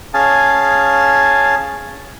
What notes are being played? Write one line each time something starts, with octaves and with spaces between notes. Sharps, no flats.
C#4 G#4 F5 G#5 A5